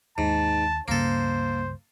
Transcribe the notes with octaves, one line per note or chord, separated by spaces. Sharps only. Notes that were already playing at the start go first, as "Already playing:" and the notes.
D#2 G#2 A5
C#2 G2 C#3 A#3 A4 C5